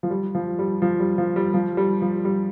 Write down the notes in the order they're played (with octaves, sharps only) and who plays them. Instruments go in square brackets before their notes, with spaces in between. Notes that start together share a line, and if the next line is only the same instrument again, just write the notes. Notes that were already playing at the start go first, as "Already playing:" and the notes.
[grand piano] F3
G3
F3
G3
F3
G3
F3
G3
F3
G3
F3
G3